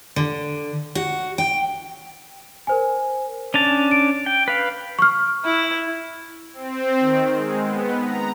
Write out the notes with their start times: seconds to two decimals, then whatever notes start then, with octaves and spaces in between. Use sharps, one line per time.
0.16 D3
0.95 F#4
1.38 G5
2.67 A#4 C5 G#5
3.54 C#4 D4 A5 F7
3.91 D7
4.26 G5
4.48 B4 F5
4.99 C#6 F6
5.44 E4
6.53 C4
6.99 D#3
7.34 G#3
7.65 B3
8.01 A#5